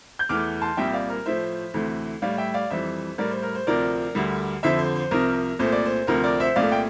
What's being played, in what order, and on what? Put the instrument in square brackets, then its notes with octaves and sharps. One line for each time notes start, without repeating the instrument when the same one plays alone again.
[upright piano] G6
E2 E3 A3 D6 F6
A5 C6
C2 A#2 G3 E5 G5
D5 F5
A#4
A2 F3 A3 C5 E5
D2 C3 E3 A3
A2 G3 D5 F5
E5 G5
D5 F5
F2 E3 G3 C5 E5
A2 G3 A#4 D5
C5
A#4
C5
D2 C3 F3 A#4 D5
D2 D3 G3
F2 D3 F3 C5 E5
C5
C5
C2 C3 F3 A#4
C2 A#2 A3 C5
D5
C5
D2 C3 F3 A#4
A#4 D5
C5 E5
C2 A#2 A3 D5 F5
G5